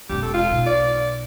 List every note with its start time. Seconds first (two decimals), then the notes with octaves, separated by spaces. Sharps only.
0.10 E1 C#4 G4
0.22 A4
0.34 F4
0.51 B1
0.66 D5